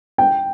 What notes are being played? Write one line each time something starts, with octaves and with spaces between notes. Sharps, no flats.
G5